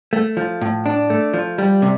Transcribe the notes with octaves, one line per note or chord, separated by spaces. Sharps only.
A3
F3
A2
D4
A3
F3
G3
C3